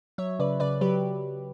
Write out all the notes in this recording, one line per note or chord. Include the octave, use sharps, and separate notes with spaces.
F#3 C#5 E5
C#3 B4 D5
C#3 B4 D5
F#3 G4 B4